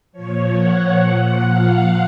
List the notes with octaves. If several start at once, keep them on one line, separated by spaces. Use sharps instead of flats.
A#2 F3 C#5
F#5
A#2 F3 F#5
F5